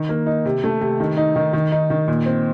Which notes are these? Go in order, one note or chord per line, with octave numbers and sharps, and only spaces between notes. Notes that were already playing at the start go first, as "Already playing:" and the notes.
Already playing: D#3
A#3
D#4
C3
A3
C3
D#3
D#4
D#3
D#3
D#4
D#3
A#2
C4